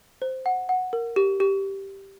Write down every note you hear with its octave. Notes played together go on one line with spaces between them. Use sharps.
C5
F#5
F#5
A#4
G4
G4